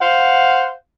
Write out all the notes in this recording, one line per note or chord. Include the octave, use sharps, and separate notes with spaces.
C5 F5 F#5